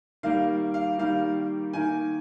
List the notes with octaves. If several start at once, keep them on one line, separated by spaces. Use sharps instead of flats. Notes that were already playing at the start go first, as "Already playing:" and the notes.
D#3 G3 A#3 F5
F5
D#3 G3 A#3 F5
D#3 A#3 G#5